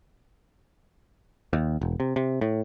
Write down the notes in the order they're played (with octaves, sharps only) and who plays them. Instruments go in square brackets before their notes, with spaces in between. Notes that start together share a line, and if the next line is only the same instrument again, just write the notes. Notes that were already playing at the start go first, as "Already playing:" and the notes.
[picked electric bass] D#2
E1
C3
C3
A2